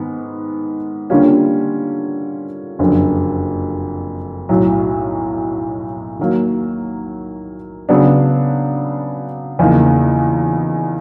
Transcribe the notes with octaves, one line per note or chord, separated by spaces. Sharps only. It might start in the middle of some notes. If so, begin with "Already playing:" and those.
Already playing: G#2 D#3 B3
D3 G3 A#3 C#4 F4
F#1 F2 D3
B1 A2 F#3
D#3 F#3 A#3
C#3 F#3 B3 D4
E2 C#3 F3 A#3 D#4